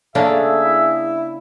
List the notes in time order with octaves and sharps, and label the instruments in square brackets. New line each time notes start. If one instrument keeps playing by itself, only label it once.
[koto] C#3 A#3 D4 [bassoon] A3 [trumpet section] G#4 E5
[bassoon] E4